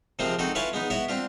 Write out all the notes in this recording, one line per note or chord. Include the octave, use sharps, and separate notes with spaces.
C3 F3 G#3 A#3 C4 F4
C4 D#4 F#4 A4
E4 F4 B4 C#5 G#5 A5
G#3 B3 D#4
B3 E4 F#4 C#5
C4 D4 F4